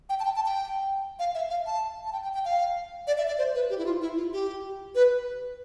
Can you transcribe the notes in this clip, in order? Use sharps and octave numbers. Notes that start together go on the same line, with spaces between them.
G5
A5
G5
A5
G5
F5
E5
F5
A5
A5
G5
G5
G5
F5
D5
E5
D5
C5
B4
G4
E4
F4
E4
F4
G4
B4